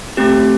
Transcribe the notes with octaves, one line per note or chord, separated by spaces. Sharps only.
A3 C4 G4